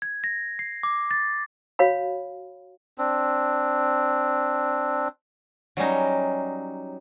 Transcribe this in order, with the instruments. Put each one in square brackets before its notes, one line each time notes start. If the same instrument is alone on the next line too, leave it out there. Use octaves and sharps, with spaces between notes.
[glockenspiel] G#6
A#6
C7
D6
A6
[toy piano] F#4 C#5 F5 B5
[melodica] C4 D4
[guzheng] F#3 G3 C#4 D#4